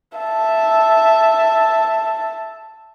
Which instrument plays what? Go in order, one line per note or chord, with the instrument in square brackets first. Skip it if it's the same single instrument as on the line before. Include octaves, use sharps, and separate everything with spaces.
[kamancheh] E5 A5